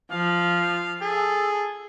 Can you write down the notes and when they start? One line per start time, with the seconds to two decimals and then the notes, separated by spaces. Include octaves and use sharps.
0.12 F3 F5
1.01 G#4 A4